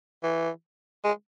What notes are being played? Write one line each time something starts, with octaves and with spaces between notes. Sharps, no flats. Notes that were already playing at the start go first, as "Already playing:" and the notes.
E3
G#3